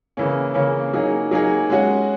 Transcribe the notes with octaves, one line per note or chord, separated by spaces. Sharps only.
C#3 E3 A#3 C#4
C#3 E3 A#3 C#4
F#3 A#3 D#4 G#4
F#3 A#3 D#4 G#4
G#3 C#4 F#4